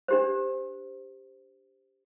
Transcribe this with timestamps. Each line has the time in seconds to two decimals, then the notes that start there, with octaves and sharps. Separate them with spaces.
0.08 D4 G4 C5